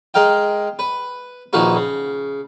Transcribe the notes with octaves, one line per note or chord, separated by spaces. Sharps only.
G#3 A#4 F5 G5
B4
A#1 D#3 F3 A#3 F#4 B4
C#3